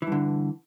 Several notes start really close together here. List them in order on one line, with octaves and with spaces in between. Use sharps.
E3 G2 D3